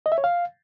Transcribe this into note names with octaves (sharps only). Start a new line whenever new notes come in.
D#5
E5
C#5
F5